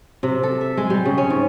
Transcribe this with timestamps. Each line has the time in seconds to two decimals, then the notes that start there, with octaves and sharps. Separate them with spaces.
0.23 C3
0.43 A4
0.61 E5
0.77 G#3
0.90 G3
1.06 C#3
1.18 C#4
1.30 G#2